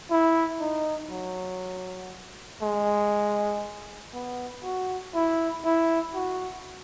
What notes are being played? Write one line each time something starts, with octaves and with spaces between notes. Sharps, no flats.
E4
D#4
F#3
G#3
B3
F#4
E4
E4
F#4